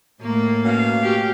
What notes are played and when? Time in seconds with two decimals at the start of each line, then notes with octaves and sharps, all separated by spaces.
0.21 A2 A3 A#3
0.64 B2 C#4 F5
1.00 F#4 G4